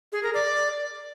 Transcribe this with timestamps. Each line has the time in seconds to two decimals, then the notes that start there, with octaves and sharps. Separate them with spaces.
0.12 G#4
0.23 A#4
0.34 D5